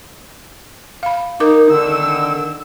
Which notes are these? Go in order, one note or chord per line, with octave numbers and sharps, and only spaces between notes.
F5 B5
D#4 A#4 D6
D3 D#3 E6